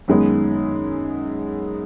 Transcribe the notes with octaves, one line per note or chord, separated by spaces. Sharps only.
F#2 D#3 G#3 B3